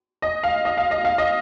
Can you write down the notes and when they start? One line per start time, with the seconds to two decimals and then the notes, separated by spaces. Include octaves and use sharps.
0.22 D#5
0.43 F5
0.65 D#5
0.77 F5
0.91 D#5
1.05 F5
1.18 D#5